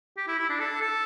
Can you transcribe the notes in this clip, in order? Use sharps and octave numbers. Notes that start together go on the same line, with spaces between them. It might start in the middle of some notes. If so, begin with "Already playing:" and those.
G4
E4
E4
D4
A4
A4